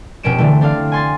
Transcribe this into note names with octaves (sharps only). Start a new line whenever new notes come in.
F1 B2 C4 C#4 D7 E7
D3 E3 A3
C4 D4 A4 F5
G#5 C6 A6